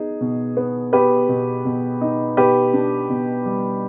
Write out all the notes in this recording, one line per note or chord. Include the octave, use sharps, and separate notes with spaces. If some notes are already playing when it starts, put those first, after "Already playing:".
Already playing: B3 D#4 G#4
B2
B3
B3 G4 B4
B2
B2
D#4
B2 G4 B4
D4
B2
G3